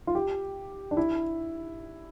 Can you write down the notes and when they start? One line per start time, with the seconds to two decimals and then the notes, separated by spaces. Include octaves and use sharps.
0.07 F4
0.15 G4
0.91 D4
0.97 E4